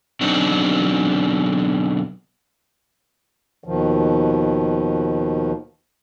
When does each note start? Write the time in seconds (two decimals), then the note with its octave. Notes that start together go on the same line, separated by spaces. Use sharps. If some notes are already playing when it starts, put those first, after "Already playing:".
0.21 B2 D3 F#3 C4 D4 D#4
3.64 D#2 B2 D#3 F3